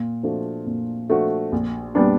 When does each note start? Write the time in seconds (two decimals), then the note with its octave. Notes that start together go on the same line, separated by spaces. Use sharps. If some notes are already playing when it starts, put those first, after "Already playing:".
Already playing: A#2
0.23 F3 A3 D4 F#4
0.66 A#2
1.09 F3 A3 D4 F#4
1.52 A#1
1.95 A#2 G3 B3 D4